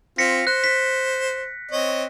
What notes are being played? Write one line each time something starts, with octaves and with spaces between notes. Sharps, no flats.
C4 F4 A#6 B6 C#7
C5 F#6
B6
C4 C#5 D#5